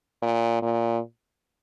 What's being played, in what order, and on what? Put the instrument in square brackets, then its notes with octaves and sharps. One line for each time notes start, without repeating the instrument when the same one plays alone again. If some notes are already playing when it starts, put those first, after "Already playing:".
[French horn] A#2
A#2